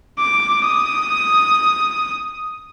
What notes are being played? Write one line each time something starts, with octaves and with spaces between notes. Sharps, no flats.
D6
D#6